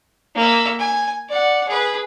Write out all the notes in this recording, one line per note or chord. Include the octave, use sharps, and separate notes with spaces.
A#3 E5
G#5
D5 F#5
G#4 B4